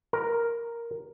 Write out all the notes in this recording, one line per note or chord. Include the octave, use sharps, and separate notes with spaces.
A#4